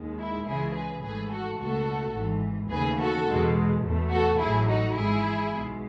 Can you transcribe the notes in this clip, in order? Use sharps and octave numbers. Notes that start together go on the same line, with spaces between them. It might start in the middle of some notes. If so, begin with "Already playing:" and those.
Already playing: D#2 D#3 G#3
E4
C#2 C#3 E3 G#3 E4 G#4
G#4 B4
G#1 G#2 E3 A3 G#4 B4
F#4 A4
C#2 B2 A3 F#4 A4
G#1 G#2 E3
D#2 C#3 E3 A3 G#4 B4
F#4 A4
E2 B2 G#3
E2 B2 A3
F#4 A4
A1 A2 F#3 A3 E4 G#4
D#4 F#4
G#1 G#2 E3 G#3 E4 G#4
B1 B2 G#3